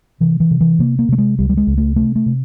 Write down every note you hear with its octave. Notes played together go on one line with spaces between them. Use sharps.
C3 E3
E3
C3
E3
C3 A#3
A#3
C3 A3
G#3
C#2 G3
G3
G#3
C#2
A3
C3 A3
A3
C3